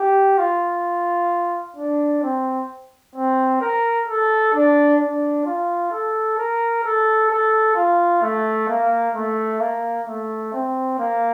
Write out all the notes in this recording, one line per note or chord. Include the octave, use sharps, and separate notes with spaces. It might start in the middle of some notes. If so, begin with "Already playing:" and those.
Already playing: G4
F4
D4
C4
C4
A#4
A4
D4
D4
F4
A4
A#4
A4
A4
F4
A3
A#3
A3
A#3
A3
C4
A#3